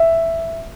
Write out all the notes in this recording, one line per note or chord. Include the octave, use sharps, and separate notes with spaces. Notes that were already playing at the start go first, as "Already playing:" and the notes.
Already playing: E5